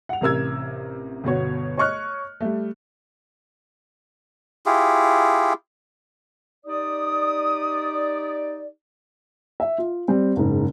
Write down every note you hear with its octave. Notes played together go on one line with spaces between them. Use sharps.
F#5 F7
A1 C3 A#4 E6 G#6
G1 B2 F#4 C#5
C#5 D#5 C#6 F6 F#6
G3 A3
E4 F4 G4 G#4
D#4 G4 D5 D#6
E5
F4
G3 C4
F#1 G#2